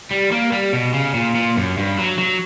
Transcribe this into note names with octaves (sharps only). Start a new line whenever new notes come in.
G3
A#3
G3
B2
C#3
A#2
A#2
F#2
G2
F#3
F#3